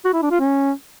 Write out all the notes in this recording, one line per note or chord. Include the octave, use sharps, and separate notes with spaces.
F#4
E4
D4
F4
C#4